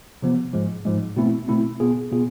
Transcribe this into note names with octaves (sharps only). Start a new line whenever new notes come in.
C3 F3 B3
G#2 F3 G#3
G#2 F3 G#3
B2 A3 C4 E4
B2 A3 C4 E4
B2 B3 F4 G#4
B2 B3 F4 G#4